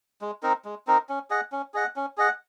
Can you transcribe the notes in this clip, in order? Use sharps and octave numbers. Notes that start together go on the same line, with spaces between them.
G#3
C4 D#4 A#4
G#3
C4 D#4 A#4
C#4
G#4 D#5 F#5
C#4
G#4 D#5 F#5
C#4
G#4 D#5 F#5